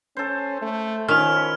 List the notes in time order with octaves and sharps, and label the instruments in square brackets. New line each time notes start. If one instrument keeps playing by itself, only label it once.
[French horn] C#4 [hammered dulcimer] A4 C5
[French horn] A3
[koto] D#3 [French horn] F3 [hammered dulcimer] C#4 E4 [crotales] F6 F7